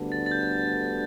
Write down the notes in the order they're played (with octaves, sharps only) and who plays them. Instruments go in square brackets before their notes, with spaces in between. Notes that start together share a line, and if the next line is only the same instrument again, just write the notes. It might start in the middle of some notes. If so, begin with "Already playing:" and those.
Already playing: [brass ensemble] D2 D3 G3 B3 D4
[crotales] A6
A6
G6